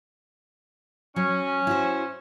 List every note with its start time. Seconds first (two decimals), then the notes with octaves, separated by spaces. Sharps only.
1.16 F#3 C#4
1.67 E4 F#4 C5